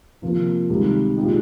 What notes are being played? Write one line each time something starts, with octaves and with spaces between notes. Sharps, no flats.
C3 F3 A#3
C#2 C3 D#3 G3
A#2 G#3 D#4 G4